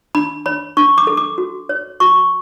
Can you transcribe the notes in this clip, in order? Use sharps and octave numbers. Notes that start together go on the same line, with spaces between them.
D4 B5
C#5 B5
D4 C#6
D6
A4
D6
F#4
C#5
F#4 C#6